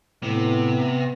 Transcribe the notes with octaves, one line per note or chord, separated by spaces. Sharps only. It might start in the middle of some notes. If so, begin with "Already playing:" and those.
A2 C3 B3